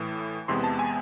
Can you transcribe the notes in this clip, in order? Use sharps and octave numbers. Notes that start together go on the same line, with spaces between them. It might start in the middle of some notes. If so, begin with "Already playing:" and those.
Already playing: A2 E3 A3
E2 C3 G#3 B3 C6
A5
G#5